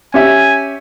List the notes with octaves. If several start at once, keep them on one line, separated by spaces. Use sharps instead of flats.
C#4 G4 E5 G#5